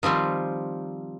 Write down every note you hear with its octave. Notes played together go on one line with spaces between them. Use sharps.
D#3 F3 G3 C4